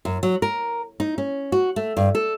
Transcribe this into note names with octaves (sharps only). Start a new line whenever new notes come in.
F#2
F#3
A#4
D#4
C#4
F#4
A3
G2
A4